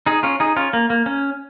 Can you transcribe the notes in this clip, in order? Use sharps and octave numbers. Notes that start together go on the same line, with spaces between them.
D#4 G#4
C#4 F4
D#4 G#4
C#4 F4
A#3
A#3
C#4